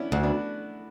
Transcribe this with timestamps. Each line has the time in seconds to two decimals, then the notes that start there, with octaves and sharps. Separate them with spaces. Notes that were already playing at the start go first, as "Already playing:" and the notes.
Already playing: B3 C#4 D4 E4
0.12 D2 D4 F#4
0.23 B3 D4